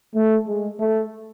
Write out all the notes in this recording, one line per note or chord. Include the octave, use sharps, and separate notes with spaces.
A3
G#3
A3